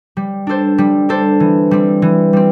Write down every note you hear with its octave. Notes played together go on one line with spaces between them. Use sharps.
G3
D4 A4 C5
G3
D4 A4 C5
E3
G3 C4
E3
G3 C4